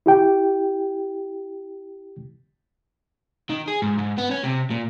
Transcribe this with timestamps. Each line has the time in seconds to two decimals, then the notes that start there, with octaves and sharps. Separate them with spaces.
0.06 E4 G4 G5
3.50 D#3
3.68 G#4
3.82 G#2
3.98 G#2
4.18 B3
4.31 C#4
4.44 C3
4.71 A#2